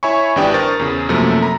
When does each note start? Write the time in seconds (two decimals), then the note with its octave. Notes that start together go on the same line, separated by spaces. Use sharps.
0.03 E4 C#5 E5 G#5 B5 C#6
0.36 G#1 E3 D4 G4 G5 D#6
0.54 A#4 C5 C#6 A6
0.79 E2 C#3
1.09 F#2 C3 F3 F#3 A3 A#3
1.43 A#5 B5